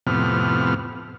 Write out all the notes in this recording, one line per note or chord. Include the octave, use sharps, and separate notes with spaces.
F2 A2 C3 B3 F6